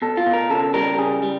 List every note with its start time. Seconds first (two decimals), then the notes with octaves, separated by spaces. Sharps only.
0.02 B2 A4
0.17 F4
0.26 B2
0.33 A#4
0.50 C#3 A4
0.74 G3 A#4
0.98 C#3 G#4
1.23 G3